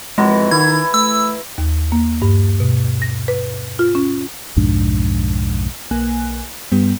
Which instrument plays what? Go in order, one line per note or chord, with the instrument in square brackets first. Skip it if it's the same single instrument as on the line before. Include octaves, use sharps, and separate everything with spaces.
[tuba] F2 [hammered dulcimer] E3 F#3 [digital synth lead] G#3
[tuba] D#3 [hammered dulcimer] E4 [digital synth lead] G#6
[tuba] A3 [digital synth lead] E6
[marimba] D#2
A#3
G2
B2
A#6
B4
F4
C#4
[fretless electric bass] B1 F2 G#2 D4
[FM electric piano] B1 A#3 G#5 F#6
G2 G3 B3